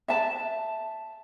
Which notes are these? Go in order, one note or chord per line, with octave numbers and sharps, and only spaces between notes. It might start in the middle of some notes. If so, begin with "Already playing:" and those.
E5 A5